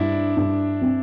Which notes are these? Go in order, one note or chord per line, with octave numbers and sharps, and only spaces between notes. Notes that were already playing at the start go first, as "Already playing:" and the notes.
Already playing: G2 D4 E4 D5
G2
C4